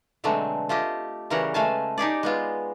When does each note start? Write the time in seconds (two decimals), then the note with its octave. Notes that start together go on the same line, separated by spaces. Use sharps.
0.24 B2 D3 F#3 G#3 A3 C4
0.69 A3 F4 G4 D#5
1.30 C#3 E3 G3 A#4 C#5 F#5
1.54 G#3 A3 F5 G#5 A5
1.98 D#4 G4 G#4 D5
2.23 G#3 B3 F4